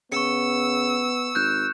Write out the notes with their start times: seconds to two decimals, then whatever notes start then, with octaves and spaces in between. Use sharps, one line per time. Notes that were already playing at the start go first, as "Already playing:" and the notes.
0.12 C#3 B3 C#6 E6 C#7
1.35 G#1 F#6 G6 E7